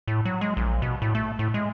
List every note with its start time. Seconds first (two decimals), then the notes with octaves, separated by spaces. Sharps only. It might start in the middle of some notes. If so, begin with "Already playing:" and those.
0.08 A2
0.25 F#3
0.41 G#3
0.57 A#1
0.82 B2
1.02 A2
1.15 A3
1.39 A2
1.54 G#3